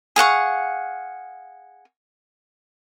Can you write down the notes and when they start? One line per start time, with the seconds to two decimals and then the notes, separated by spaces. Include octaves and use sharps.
0.16 G#4 F5 F#5 C#6